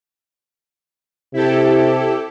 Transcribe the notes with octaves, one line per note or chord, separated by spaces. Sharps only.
C3 E4 G4 A4